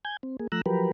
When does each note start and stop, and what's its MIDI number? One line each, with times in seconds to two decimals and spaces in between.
0.05 0.17 80
0.05 0.17 91
0.05 0.17 92
0.23 0.37 60
0.40 0.47 58
0.40 0.47 68
0.52 0.62 53
0.52 0.62 57
0.52 0.62 82
0.52 0.62 88
0.52 0.62 90
0.66 0.92 53
0.66 0.92 54
0.66 0.92 67
0.66 0.92 70
0.66 0.92 71